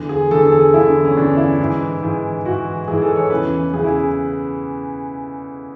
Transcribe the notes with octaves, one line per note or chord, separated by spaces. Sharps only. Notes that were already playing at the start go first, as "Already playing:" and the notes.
Already playing: E2 D3
G#4
E2 D3 A4
A4
G#4
E2 D3 E4
C#4
E2 D3 D4
E4
G#2 E3
G#2 E3
G#2 E3 F#4
G#2 E3 G#4
A4
C#5
E2 C#3 E3 B4
E2 C#3 E3 G#4
E4